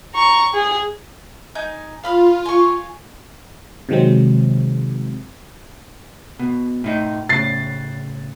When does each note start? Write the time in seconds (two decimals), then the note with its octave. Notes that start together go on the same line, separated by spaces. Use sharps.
0.14 A#5 C#6
0.53 G#4
1.55 D#4 G#5 G6
2.03 F4 F5 B5 F6
2.46 G#5 C#6
3.89 C3 D#3 F#3 G#3 C4
6.39 B2
6.84 A2 D#4
7.29 A2 C#3 A6 C7